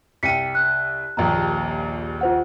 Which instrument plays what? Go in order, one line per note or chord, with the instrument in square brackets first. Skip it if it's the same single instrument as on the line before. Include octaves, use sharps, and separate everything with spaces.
[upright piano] C2 G5 D#7 [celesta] B6 C#7
[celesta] F#6
[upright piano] D#1 A#1 D#2 [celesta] A#5
[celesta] F4 C5 F#5